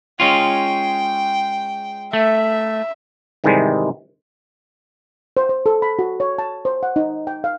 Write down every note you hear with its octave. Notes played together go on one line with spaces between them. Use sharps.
G#3 C#4 F4 G5
A3 E5
G#2 C3 D#3 E3 G3 G#3
C5
C5
A4
B5
F#4
C#5
A5
C5
F#5
D#4
G5
F5